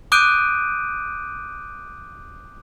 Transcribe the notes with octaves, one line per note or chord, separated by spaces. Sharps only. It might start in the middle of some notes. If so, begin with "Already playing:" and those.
D6 D#6 F#6 G6 D7 D#7